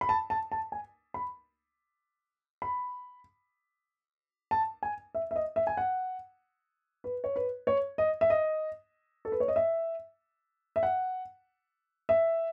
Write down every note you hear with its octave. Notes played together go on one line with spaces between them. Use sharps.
B5
A5
A5
A5
G#5
B5
B5
A5
G#5
E5
E5
D#5
E5
G#5
F#5
B4
C#5
B4
C#5
D#5
E5
D#5
A4
B4
C#5
D#5
E5
E5
F#5
E5